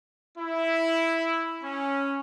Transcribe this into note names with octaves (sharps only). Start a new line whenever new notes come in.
E4
C#4